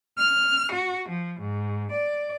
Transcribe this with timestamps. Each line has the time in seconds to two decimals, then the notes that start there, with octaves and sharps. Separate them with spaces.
0.18 F6
0.72 F#4
1.08 F3
1.40 G#2
1.91 D5